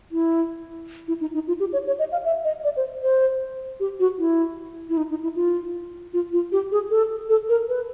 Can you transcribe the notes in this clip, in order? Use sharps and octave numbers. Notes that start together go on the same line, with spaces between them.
E4
E4
D#4
D#4
F4
G4
C#5
C#5
D#5
F5
E5
D#5
D5
C5
C5
G4
F#4
E4
E4
D#4
D#4
E4
F4
F4
F4
G4
G#4
A4
A4
A#4
B4